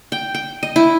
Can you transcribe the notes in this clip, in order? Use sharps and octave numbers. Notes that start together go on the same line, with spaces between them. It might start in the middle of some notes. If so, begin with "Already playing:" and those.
G5
G5
D#5
E4